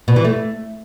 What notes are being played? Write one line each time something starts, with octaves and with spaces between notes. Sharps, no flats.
B2
E3
A3